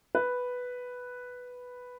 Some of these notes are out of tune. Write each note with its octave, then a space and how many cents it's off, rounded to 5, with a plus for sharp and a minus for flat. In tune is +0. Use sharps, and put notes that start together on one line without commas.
B4 +0